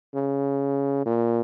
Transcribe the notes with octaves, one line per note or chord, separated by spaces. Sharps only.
C#3
A#2